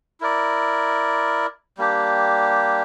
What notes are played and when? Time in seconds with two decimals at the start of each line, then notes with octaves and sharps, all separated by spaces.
0.21 E4 A#4 D5
1.78 G3 A#3 D4 G4